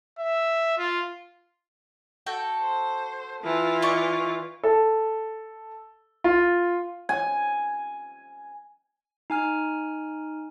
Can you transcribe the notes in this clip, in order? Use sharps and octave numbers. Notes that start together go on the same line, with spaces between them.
E5
F4
F#4 A4 G5
C5
E3 F4
D5 D#5 C#6
A4
F4
G#5
D#4 G#5 F6